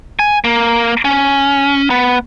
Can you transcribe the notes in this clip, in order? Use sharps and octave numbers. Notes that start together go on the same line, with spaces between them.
G#5
A#3
C#4
B3